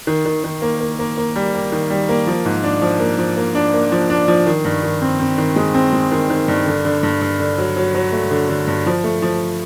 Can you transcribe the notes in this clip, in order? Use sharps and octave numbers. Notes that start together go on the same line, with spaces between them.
D#3
D#3
D#3
A#3
A#3
A#3
A#3
G3
A#3
D#3
G3
A#3
F3
G#2
D4
F3
A#3
F3
A#3
D4
A#3
F3
D4
F3
D#3
G2
D#3
C4
C4
D#3
G#3
C4
G#3
D#3
D#3
G2
D3
D3
G2
G2
D3
F#3
F#3
F#3
A3
D3
D3
G2
F3
A3
F3